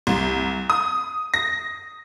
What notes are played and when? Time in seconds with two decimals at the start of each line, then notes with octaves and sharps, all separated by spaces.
0.07 C2
0.70 D#6
1.34 A#6